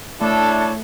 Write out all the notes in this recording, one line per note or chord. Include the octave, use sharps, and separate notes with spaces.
A3 D4 E4 A4 C#5